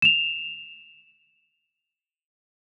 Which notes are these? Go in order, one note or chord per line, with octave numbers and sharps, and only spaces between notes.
E7 F7